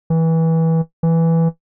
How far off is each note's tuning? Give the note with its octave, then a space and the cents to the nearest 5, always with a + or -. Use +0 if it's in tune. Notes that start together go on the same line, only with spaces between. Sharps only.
E3 -20
E3 +0